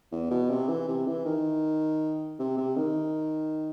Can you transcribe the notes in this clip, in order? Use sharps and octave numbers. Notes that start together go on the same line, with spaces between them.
E2
B2
C3
E3
C3
E3
D#3
C3
C3
D#3